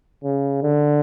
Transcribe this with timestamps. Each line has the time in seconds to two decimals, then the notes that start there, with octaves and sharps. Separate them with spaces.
0.24 C#3
0.63 D3